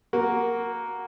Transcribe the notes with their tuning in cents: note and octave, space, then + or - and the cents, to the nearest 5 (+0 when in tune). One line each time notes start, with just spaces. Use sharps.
A#3 +0 F#4 +0